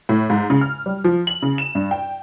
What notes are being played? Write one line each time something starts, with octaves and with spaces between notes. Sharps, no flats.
A2
G#2
C#3
F6
G3
F3
F#7
C#3
E7
G2
G5